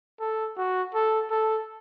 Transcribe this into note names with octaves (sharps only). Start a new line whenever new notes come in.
A4
F#4
A4
A4